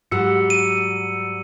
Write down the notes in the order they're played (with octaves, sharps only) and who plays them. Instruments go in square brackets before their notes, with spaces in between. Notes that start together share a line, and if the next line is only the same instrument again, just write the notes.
[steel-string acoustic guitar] G#2 F#3 G3 [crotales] E6 C#7
[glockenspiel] D#7